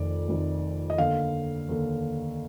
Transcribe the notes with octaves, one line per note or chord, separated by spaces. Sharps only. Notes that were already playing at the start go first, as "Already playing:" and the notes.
Already playing: F1 F2 D#3 D5
F1 F2 D#3
D#5
D#2 D3 F5
D#2 D3